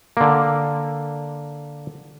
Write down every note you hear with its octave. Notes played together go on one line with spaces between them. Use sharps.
D3 A#3